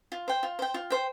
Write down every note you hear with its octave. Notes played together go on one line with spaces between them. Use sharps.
F4
C5 G5
F4
C5 G5
F4
C5 G5